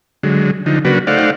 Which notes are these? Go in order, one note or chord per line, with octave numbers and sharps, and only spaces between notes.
D3 F#3 G#3
D3 F3 D#4
C#3 F#3 A#3 D4 F#4 B4
A3 D#4 C5 D5 F5 F#5